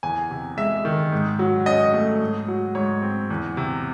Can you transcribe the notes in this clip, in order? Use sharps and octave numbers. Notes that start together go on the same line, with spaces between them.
E2 G#5
C3
G#3 E5
D#3
G#2
F#3
C#4 D#5
A3
G#2
F#3
G#2 C#5
C4
E2
C3